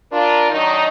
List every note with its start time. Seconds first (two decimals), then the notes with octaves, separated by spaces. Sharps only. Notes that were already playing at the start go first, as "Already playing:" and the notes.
0.12 D4 F4 A#4
0.51 D#3 F#3 D4 D#4